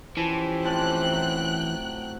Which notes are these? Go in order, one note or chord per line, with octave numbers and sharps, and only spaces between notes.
E3 F3 C#4 G4 C5
A2 C4 G5 A5 F#6
F#3